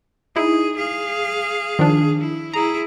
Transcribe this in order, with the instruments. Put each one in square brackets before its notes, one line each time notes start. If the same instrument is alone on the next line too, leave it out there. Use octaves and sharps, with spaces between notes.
[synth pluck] D#4 E4 [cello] G#4
[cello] G#4 F5
[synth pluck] D#3 F3 D4
[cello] E4
[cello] E4 G#4 [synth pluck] A#5